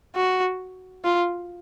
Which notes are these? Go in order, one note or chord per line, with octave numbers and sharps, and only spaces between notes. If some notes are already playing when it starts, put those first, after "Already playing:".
F#4
F4